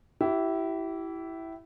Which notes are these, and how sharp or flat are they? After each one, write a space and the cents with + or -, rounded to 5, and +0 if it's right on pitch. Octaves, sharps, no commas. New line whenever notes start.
E4 +0 G4 -35